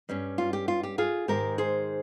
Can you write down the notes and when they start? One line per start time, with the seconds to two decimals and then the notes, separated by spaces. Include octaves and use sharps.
0.09 G2 G3 C#4
0.38 F4
0.53 G4
0.68 F4
0.83 G4
0.98 F4 G#4
1.28 G#2 D#3 G#3 D#4 G4 A#4
1.58 G#4 C5